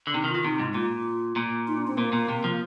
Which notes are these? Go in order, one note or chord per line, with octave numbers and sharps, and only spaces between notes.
D3
C3 D#4
D#3
F4
D#3
C3 D#4
G#2
A#2 F4
A#2
D#4
D4
C4
A#2 A#3
A#2
C3
F3